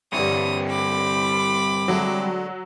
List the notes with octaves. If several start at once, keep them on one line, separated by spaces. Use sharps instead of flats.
G2 D3 E3 G3 C4 C#5 D#6
B5 D6
D3 F#3 G#3 A3